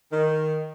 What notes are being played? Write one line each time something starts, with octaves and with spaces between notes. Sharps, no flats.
D#3